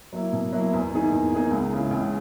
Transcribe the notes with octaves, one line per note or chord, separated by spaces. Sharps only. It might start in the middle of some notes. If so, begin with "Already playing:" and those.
F#3 A#3 E4
B2
F#3 A#3 E4
E2
D#3 A#3 D#4 G#4
E2
D#3 A#3 D#4 G#4
C#2
C#3 E3
C#2